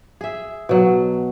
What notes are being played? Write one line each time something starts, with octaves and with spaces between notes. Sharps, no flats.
G#4 E5
B2 F#3